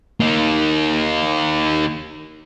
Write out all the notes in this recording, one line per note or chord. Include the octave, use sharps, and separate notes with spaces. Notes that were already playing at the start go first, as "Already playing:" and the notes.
A#3 D#4